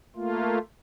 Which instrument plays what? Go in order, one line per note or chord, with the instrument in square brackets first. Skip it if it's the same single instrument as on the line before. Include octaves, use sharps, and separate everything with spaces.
[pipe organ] A3 A#3 F4